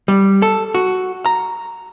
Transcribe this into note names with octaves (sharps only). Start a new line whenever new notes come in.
G3
A4
F#4
A#5